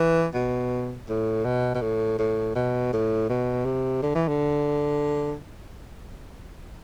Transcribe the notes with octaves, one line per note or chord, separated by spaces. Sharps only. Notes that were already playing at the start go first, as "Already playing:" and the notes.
Already playing: E3
B2
A2
B2
B2
A2
A2
B2
A2
B2
C3
D3
E3
D3